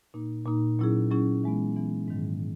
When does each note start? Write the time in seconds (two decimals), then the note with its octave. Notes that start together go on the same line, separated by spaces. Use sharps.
0.14 A#2 A#3 D#4
0.46 A#2 A#3 D#4
0.79 A#2 F#3 C#4 E4 G#4
1.11 A#2 F#3 C#4 E4 G#4
1.44 E3 G#3 B3
1.76 E3 G#3 B3
2.08 G#2 D#3 F#3